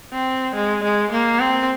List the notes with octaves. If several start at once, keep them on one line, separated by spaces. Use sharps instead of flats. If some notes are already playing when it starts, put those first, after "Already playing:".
C4
G#3
G#3
A#3
C4